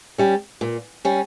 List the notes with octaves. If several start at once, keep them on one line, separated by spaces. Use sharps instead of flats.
G3 C#4
A#2
G3 C#4